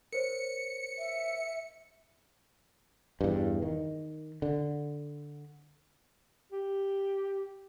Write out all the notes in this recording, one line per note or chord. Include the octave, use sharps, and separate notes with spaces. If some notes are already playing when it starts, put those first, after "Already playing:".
A#4 C5 C#5 C#7
E5
E2 G2
D#3
D3
G4